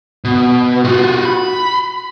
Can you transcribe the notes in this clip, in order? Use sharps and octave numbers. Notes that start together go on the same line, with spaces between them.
B2
F4 F#4
B5